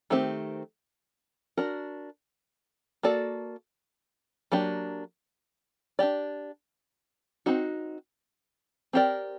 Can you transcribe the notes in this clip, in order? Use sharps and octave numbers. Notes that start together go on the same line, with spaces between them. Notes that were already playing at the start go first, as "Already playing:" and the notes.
D#3 A3 C4 G4
D4 F#4 A#4
A#3 F#4 A4 D5
F#3 A#3 D4 G4
D4 G4 D5
C4 D#4 F#4
C4 G4 A#4 D5